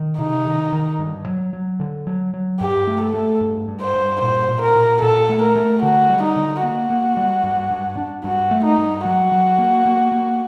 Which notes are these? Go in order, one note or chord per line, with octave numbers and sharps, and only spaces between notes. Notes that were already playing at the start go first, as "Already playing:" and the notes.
Already playing: D#3
C3 D#4
D#3
D#3
G2
F#3
F#3
D3
F#3
F#3
G2 G4
A3
A4
A3
G2
G2
C5
G2
A#2 C5
A#2
A#4
A#2
A#2 A4
A3
A#4
A3
D3 F#4
G3
D#4
D3
A#3 F#4
A#3
G3
G2
G2
D4
G2 F#4
A3
D#4
G2
F#3 F#4
F#3
A#3
A#3
A#3